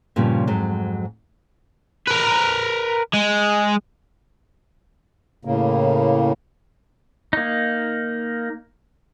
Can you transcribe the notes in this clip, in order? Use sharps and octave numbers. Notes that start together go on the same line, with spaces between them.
G2 A#2 C#3 F3 G3
F2 G#2 F#3
A#4 B4
G#3
A2 C#3 A#3
A#3 D#4